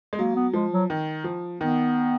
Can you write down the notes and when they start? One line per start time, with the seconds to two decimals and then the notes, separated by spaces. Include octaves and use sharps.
0.13 G#3
0.18 F#3 A#3
0.36 B3
0.53 F3 G#3
0.72 F#3
0.90 D#3
1.24 F3
1.60 D#3 B3